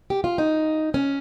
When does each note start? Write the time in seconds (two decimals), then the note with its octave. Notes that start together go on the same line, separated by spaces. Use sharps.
0.10 G4
0.24 F4
0.38 D#4
0.94 C#4